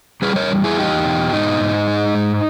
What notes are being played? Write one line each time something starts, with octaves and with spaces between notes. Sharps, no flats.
G3 G#4 B4
A#4 C#5
E2
E4 G#4
E2 D#4 G4
B2
G#2 D#4
G#2
G#3
G#2